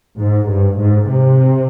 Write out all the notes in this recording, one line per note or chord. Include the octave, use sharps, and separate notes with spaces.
G#2
G2
G#2
C3